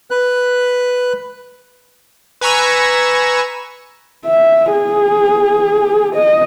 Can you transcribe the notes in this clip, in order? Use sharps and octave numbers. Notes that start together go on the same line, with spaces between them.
B4 F#6
B4 G#5 A#5 C#6 E6
E5
G#4
D#5